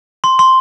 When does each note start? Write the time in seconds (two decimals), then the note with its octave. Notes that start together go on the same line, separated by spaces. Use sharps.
0.24 C6
0.39 C6